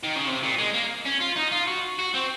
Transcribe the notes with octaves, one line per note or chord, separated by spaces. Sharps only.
D#3
C#3
C3
A#2
G#3
A#3
C#4
F4
D#4
F4
F#4
F#4
C4